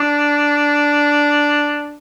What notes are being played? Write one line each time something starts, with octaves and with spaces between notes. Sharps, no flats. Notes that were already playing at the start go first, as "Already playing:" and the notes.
Already playing: D4